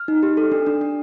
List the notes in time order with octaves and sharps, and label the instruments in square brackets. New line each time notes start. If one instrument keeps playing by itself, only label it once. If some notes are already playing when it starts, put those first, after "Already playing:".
Already playing: [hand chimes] F6
D#4
G4
A4
D4
D4
D4